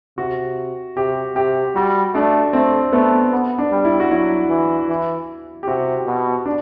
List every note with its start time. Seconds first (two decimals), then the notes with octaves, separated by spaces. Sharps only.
0.18 C3 F#4
0.97 C3 G4
1.35 C3 G4
1.75 G3 F#4
2.14 A3 D4
2.53 A3 C4
2.93 A3 B3
3.32 B3
3.58 D4
3.72 G3
3.85 E4
4.00 F#4
4.10 F#3 E4
4.50 E3
4.89 E3
5.63 G4
5.68 C3 F#4
6.07 B2
6.46 D4